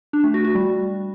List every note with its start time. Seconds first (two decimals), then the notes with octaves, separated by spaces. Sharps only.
0.13 D4
0.24 A3
0.34 F#4
0.44 F#4
0.55 G3